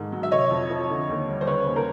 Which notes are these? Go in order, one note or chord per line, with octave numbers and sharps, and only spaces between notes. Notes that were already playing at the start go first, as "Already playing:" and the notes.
Already playing: G#2 D#3 A3
F#3
E5
C3 C#5 D#5
F2
F3
D3
D#2
G3
C5
C#3 B4 C#5
D#2
A#4 C5